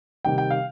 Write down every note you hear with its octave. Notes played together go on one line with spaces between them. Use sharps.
C3 D#3 G3 G5
G5
F5